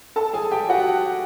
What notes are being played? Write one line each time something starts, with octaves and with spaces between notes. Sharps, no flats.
A4 A5
G#4 G#5
G4 G5
F#4 F#5